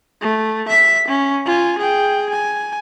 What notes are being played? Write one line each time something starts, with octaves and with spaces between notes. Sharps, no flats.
A3
E5 B6
C#4
F4 G#5
G#4 G5
G#5